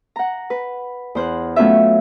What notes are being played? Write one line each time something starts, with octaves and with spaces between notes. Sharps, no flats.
F#5 A#5
B4
E2 C5 F#6
F#3 A3 B3 C#4 F4 E5